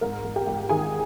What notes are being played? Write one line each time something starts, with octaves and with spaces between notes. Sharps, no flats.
G#2 A#4
G#2
G4 G5
G#2
D#3 G#4 G#5